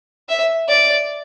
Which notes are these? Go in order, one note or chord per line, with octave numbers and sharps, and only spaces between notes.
E5
D5